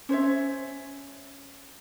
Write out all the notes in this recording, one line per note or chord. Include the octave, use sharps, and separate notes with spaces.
C#4 C5 C#5 E5